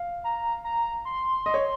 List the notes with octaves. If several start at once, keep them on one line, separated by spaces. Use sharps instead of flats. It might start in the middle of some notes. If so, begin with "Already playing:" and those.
Already playing: F5
A#5
A#5
C6
D#5
C#5